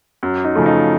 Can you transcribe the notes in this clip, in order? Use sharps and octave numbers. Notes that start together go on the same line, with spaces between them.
F#2
D#4
C#3 F3 A3
D#4